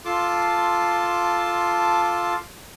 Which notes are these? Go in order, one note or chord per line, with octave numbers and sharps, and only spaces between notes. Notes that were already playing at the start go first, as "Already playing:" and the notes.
F4 A4 A5 C6 D6